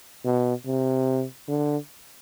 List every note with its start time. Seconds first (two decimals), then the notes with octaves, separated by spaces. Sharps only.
0.25 B2
0.66 C3
1.48 D3